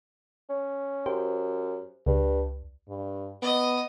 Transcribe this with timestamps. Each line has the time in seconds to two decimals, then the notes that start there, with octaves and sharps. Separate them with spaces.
0.49 C#4
1.06 F#2 G4 C5
2.06 C#2 G2
2.89 G2
3.42 B3 D#5